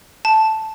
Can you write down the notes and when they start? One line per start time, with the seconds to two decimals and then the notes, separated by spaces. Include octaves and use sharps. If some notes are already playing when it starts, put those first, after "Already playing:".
0.25 A5